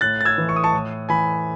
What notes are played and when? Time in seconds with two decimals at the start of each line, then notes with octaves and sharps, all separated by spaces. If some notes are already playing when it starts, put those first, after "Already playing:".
0.01 A2 F#6 A6
0.21 A6
0.25 E6 G#6
0.38 E3
0.49 C#6
0.56 D#6
0.64 A5 C#6
0.73 A2
1.09 E3 G#5 B5